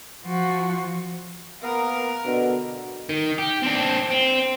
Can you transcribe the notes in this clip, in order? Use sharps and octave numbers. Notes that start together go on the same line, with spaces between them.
F3 F#4
A#3 B3 A#4
B2 D3
D#3
G4
C4 D4
C4